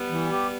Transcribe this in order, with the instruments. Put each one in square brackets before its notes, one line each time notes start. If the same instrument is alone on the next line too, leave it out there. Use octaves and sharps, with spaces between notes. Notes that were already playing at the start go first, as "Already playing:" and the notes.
Already playing: [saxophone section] G3 B3
[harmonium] E3
G4